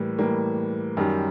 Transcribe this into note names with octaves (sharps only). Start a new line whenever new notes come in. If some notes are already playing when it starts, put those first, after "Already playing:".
Already playing: A2 E3 G3 A#3
A2 E3 G3 A#3
F#2 D#3 G3